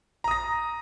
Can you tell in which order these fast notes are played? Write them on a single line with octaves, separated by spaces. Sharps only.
A#5 D#6 A#6